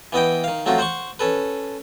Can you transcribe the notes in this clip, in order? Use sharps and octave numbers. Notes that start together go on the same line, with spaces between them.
E3 B3 D#5 G5
D#3 F5
F#3 A3 C4 F4 F#4
C5 F#5 C6 C#6
C#4 A4 B4